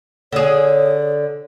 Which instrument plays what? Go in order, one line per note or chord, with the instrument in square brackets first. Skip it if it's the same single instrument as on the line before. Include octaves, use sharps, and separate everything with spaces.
[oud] D3 G#4 [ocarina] C#5